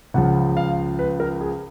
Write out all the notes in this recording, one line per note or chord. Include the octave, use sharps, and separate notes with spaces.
C#2 C#3 F3 F#5
F5
B4
A#4
G#4